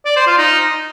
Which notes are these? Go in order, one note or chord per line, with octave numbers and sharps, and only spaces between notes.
D5
C5
F4
D#4